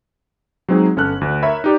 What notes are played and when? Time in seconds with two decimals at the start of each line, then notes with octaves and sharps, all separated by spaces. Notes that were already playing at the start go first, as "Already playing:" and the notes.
0.68 F#3 G#3 C4 D#4 G#4
0.96 G1 C#4 A4 F6 F#6
1.21 D2
1.42 A#4 C#5 E5 B5
1.64 D#4 G4 D5